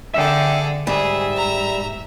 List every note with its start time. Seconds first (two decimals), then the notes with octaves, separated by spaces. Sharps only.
0.14 D3 G#4 A4 E5 G5
0.87 G#2 G3 G#4 E5
1.37 A#5